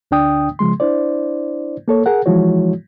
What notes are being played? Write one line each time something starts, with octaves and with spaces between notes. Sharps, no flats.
D2 D3 D4 G5 D#6
C#3 F3 G#3 C6
D4 E4 C5 D5
A#3 A4 C#5
G#4 A#4 F#5
E3 F3 G#3 E4 F#4 C#5